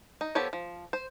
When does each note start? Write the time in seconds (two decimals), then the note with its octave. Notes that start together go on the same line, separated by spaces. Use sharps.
0.21 D#4
0.35 F3 B3 G4 A4 C#5
0.53 F3
0.93 C5